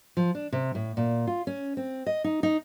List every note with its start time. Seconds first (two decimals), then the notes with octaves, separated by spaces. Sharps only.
0.17 F3
0.35 D4
0.52 C3
0.75 A2
0.97 A#2
1.27 F4
1.47 C#4
1.77 C4
2.06 D#5
2.24 D#4
2.43 D#4